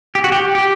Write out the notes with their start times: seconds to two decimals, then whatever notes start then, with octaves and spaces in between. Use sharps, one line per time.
0.15 G4
0.24 F#4
0.32 G4
0.55 G4